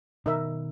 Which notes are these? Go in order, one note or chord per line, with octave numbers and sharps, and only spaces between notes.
B2 D#3 D#4 A#4 E5